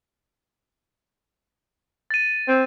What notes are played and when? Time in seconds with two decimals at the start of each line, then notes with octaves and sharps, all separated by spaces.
2.10 A6 D#7
2.48 C4